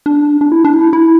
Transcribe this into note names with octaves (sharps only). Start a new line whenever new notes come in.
D4
D4
E4
D4
E4
E4